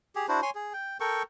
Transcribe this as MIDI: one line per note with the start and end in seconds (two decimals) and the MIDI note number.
0.15 0.26 67
0.15 0.26 68
0.28 0.40 62
0.28 0.40 64
0.28 0.40 66
0.28 0.40 72
0.42 0.50 73
0.42 0.50 80
0.42 0.50 84
0.55 0.73 68
0.73 0.98 79
1.00 1.23 69
1.00 1.23 70
1.00 1.23 79
1.00 1.23 85